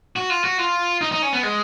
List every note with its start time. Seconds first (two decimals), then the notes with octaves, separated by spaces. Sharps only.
0.16 F#4
0.30 F4
0.44 F#4
0.58 F4
1.01 D#4
1.12 D#4
1.22 C#4
1.33 B3
1.43 G#3